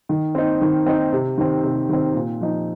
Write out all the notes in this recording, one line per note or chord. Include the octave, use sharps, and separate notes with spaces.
D#3
C4 D#4
D#3
C4 D#4
C3
D#3 C4
C3
D#3 C4
A#2
F3 D#4